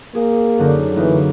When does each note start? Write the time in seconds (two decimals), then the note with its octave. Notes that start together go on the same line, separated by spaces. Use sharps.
0.15 A#3 G#4
0.59 F#2 D3 D#4
0.96 E3 A#3 B3 D#4